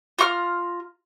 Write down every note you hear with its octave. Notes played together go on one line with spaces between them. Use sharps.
F4 A#5 C#6 F6